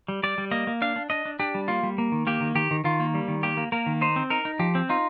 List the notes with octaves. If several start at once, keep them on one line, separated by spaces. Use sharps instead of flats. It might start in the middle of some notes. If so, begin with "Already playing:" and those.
G3
G3 D5
G3
A#3 D#5
A#3
D4 F5
D4
D4 D#5
D4
D4 G4
G3
A#3 F4
G3
A#3
D#3
A#3 G4
D#3
D#3 G4
D#3
D#3 F4
A#3
G3
D#3
A#3 G4
A#3
A#3 A#4
D#3
D#4 C5
C4
D#4 A#4
D#4
F3 G4
C4
D#4 F4